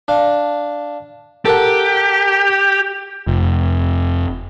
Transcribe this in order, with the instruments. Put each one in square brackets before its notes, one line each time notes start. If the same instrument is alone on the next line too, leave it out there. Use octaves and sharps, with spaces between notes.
[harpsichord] D4 F5
[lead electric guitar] G4 [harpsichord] A4 A#4 F#5
[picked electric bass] F1